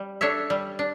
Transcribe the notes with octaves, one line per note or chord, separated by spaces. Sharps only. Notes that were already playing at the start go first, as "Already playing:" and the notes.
Already playing: G3
D4 A4 C#5 E5
G3
D4